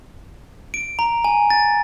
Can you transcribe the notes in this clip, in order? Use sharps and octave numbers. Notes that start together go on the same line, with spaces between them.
D7
A#5
G#5
A6